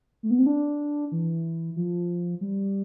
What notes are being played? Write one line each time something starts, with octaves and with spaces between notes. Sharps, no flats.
A3
B3
C4
D4
E3
F3
G3